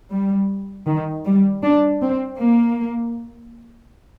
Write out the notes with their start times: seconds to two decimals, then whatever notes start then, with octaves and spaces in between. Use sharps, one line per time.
0.11 G3
0.87 D#3
1.26 G3
1.64 D4
2.02 C4
2.39 A#3